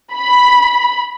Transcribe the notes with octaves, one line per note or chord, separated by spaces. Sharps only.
B5